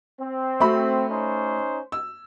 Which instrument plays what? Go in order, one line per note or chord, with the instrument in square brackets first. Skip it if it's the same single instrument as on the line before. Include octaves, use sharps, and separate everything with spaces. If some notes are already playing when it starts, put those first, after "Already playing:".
[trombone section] C4
[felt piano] A3 F#4 B5
[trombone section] C#4 D#4 C5
[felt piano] E6